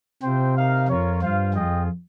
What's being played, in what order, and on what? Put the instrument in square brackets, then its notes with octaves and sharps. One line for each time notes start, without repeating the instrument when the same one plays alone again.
[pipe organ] C3 [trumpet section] C4 F4 C5 G5
[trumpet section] D#4 A#4 F5
[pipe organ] F2 [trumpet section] F4 A#4 C#5
[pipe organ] G2 [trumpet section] F4 C5 F5
[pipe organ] F2 [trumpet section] F4 G#4 D#5 G5